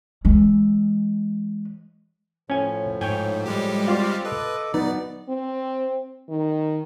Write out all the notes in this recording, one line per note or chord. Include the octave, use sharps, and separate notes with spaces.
E3 G#3
A2 F3 C#4 G#5
G#2 C#5 G5 G#5
G3 G#3 G4
C4 F4 D5 F5
A4 B4 D#5 D6
F#3 B3 D#4 D5
C4
D#3